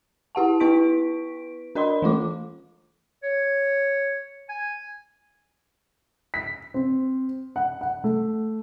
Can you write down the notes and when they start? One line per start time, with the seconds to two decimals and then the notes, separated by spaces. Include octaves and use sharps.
0.35 E4 G4 F#5 A5
0.60 B3 E4 B4 C#6 B6 D7
1.75 D4 A#4 D#5 B5 C6
2.02 E3 A3 F4 D6
3.23 C#5
4.49 G#5
6.34 B6
6.74 C4
7.56 F#5
7.81 F#5
8.04 A3